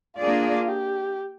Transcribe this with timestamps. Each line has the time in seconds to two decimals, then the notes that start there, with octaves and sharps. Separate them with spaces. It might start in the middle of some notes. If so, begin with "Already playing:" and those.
0.18 A#3 D4 F4 G#4 D5
0.68 G4